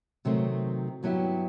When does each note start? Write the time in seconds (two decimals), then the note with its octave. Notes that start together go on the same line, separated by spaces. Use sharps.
0.25 C3 D#3 F#3 A3 C4
1.03 G2 F#3 B3 E4 G4